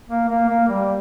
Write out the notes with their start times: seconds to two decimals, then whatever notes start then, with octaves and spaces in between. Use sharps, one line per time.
0.09 A#3
0.28 A#3
0.48 A#3
0.68 G3